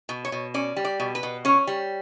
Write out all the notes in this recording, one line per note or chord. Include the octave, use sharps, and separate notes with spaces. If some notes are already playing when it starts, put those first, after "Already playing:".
B2
C#5
B2
C#4 D5
G3
D5
B2
B4
B2
C#4 C#5
G3